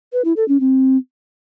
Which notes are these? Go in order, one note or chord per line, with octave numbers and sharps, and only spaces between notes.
B4
E4
A4
C#4
C4